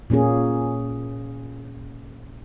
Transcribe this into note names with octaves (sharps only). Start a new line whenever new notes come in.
A#2 A#3 C#4 G#4